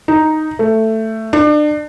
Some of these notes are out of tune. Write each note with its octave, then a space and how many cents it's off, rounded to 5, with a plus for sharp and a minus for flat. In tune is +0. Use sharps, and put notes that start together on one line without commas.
D#4 +0
A3 +10
D4 +35